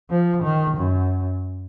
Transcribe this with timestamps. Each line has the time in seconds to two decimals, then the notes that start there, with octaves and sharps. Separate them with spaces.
0.10 F3
0.43 D#3
0.77 F#2